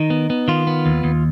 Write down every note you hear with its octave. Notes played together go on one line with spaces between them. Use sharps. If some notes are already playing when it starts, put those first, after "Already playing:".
Already playing: D#3 D#4
B3
B3
D#3 F4
B3
D#2
D#2